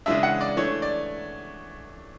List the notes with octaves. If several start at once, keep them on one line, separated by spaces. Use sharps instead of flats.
C#3 E3 G#3 D4 E5
F#5
D5
E3 A3 D4 C#5
D5